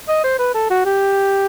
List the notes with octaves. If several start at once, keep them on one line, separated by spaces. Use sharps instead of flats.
D#5
C5
B4
A4
F#4
G4